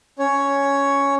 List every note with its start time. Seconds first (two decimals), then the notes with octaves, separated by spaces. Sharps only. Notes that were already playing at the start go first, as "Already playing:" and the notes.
0.19 C#4 C#5